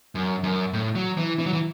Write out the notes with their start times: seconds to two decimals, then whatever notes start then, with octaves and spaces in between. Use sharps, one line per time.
0.15 F#2
0.44 F#2
0.73 A2
0.95 F#3
1.17 E3
1.39 E3
1.46 F#3
1.53 E3